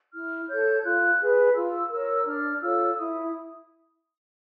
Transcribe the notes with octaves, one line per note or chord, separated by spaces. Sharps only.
E4 F6
A4 C#5 G6
F4 F#6
G#4 B4
F4 E6
A#4 E6
C#5
D4 F6
F4 A4 C#5 E6
E4 D#6